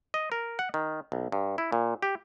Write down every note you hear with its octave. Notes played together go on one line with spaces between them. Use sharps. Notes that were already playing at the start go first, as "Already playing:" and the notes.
D#5
A#4
F#5
D#3
B1
G2
E4
A#2
G4